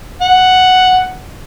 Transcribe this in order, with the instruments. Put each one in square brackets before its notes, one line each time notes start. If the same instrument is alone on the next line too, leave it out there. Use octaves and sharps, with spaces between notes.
[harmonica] F#5